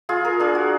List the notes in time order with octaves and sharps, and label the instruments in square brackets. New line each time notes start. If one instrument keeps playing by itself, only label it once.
[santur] F4 G#4
A#4
D4 G#4
F#4